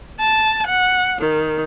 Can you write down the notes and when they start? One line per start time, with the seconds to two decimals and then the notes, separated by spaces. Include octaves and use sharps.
0.20 A5
0.67 F#5
1.21 D#3